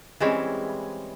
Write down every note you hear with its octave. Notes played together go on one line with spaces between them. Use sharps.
E3 G3 G#3 C4 C#4 E4